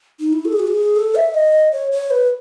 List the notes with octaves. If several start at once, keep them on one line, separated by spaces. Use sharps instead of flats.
D#4
E4
A4
G#4
F#4
G#4
A4
E5
D#5
C#5
C#5
B4